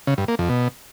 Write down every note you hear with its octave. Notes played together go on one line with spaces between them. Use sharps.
C#3
G2
A#3
F2
B2